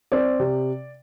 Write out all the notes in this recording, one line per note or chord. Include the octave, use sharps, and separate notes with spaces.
C4 D5
C3